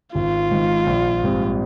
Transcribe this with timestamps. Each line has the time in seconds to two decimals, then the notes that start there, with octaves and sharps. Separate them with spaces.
0.14 G#1 F4
0.51 G#2 D#3
0.87 A#1
1.24 G#2 G3 C4